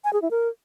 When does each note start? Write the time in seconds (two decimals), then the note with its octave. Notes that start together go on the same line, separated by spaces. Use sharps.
0.04 G#5
0.13 G#4
0.22 E4
0.31 A#4